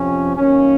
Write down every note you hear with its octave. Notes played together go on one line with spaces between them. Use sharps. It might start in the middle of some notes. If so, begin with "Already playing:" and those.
Already playing: F2 C3 F3 C4 C#4
F#2 D#3 A#3 C#4